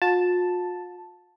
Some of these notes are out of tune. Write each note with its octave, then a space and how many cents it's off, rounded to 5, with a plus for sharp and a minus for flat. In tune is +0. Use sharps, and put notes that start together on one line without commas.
F4 +45 A5 +0